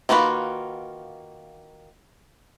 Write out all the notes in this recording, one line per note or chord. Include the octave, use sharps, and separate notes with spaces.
D#3 A#3 F4 F#4 B4